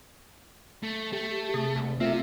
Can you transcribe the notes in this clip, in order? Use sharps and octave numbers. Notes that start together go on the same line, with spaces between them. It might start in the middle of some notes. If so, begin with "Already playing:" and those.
A3
A3 G4
C3 G#4
F#1
C3 A3 C4 F4 E5